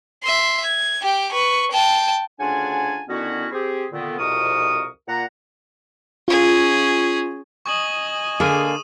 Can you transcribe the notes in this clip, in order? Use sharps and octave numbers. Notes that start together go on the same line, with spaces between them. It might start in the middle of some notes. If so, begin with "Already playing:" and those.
E5 C6
G#6
G4 G5
B4 C#6
G5 A5
D2 C#3 D4 F4 F#5 G#5
D3 D#3 B3 C#4 E4 F#4
C4 G4 G#4
A#2 D3 D#3 B3
C2 F2 B2 A#4 C#6 D#6
A#2 F#5 A#5
C#4 F4 G#4
D#5 G#5 C#6 D#6 F#7
D3 A#3 G#4 D#6 D#7